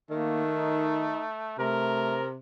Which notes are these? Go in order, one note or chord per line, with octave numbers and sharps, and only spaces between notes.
D#3 A3 A#3
D#4
C3 A3 A#4